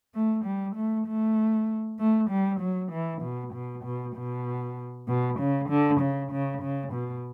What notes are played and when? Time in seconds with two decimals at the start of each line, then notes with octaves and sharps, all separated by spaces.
0.15 A3
0.45 G3
0.76 A3
1.07 A3
1.99 A3
2.30 G3
2.60 F#3
2.92 E3
3.22 B2
3.54 B2
3.84 B2
4.16 B2
5.08 B2
5.39 C#3
5.69 D3
6.01 C#3
6.32 C#3
6.62 C#3
6.93 B2